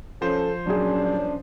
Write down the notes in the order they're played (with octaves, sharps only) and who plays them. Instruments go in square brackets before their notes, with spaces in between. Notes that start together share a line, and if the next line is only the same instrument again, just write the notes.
[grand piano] F3 C5 [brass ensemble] C#4 [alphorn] A4
[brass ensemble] A#2 G3 C#4 [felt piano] F#3 G#4 [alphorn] D4